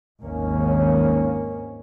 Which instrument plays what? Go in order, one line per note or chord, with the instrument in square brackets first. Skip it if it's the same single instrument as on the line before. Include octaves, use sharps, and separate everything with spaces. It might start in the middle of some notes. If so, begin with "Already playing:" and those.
[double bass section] G#1 D#2 A#3 C#4